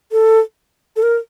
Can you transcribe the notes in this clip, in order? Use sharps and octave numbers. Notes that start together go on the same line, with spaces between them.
A4
A4
A#4